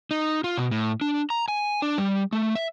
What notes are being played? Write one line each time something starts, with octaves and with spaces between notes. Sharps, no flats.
D#4
F4
B2
A2
D4
A#5
G#5
D4
G3
A3
E5